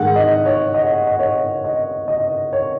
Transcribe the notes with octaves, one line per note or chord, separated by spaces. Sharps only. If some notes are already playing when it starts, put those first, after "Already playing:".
Already playing: G#2 D#3 G#3 F#5
D#5
C#5
D#5
D#5
C#5
D#5
D#5
C#5